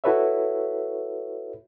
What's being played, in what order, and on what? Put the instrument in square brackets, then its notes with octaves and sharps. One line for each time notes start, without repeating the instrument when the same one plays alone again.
[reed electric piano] E4 F#4 A4 B4 C#5 E5